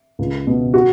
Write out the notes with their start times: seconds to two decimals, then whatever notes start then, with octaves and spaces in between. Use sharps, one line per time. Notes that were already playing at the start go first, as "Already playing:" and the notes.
0.19 C#2
0.47 B2
0.74 F#4